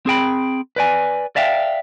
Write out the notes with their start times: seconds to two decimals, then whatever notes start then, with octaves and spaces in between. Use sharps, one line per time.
0.06 C4 G#4 G5 B5
0.76 B4 D5 G#5
1.36 D5 E5 F5 G5